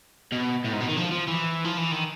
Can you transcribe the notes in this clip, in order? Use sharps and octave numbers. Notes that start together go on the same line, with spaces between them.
B2
A2
G#2
B2
D#3
F3
F3
E3
F3
E3
D#3